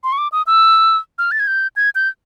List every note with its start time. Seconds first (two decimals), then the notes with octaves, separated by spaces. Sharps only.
0.04 C6
0.12 C#6
0.18 D6
0.32 D#6
0.47 E6
1.18 F6
1.32 A6
1.40 G#6
1.47 G6
1.76 G#6
1.95 G6